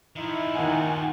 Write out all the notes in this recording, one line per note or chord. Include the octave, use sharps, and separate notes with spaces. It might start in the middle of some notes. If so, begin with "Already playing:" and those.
D#3 F3 D#4 E4
D#2 F#5 G#5